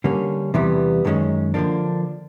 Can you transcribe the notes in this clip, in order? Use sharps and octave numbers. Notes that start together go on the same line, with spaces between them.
D3 G3 A#3 C#4
E2 C3 E3 G3 B3
F#2 D#3 G#3 C#4
D3 F3 A#3 D4